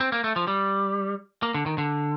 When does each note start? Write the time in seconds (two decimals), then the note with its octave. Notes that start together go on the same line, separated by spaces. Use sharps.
0.01 C4
0.12 A#3
0.24 A3
0.36 F3
0.48 G3
1.43 A#3
1.54 D3
1.66 D#3
1.78 D3